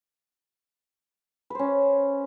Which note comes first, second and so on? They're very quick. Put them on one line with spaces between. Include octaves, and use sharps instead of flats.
B4 C5 C#4